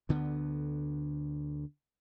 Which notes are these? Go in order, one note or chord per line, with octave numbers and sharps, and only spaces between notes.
D2 D3 B3